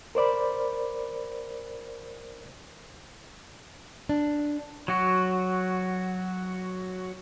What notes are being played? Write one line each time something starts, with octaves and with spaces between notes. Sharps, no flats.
A#4 C5 D5 B5
D4
F#3 F#4